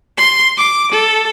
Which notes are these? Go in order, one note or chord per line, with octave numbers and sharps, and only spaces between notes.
C6
D6
A4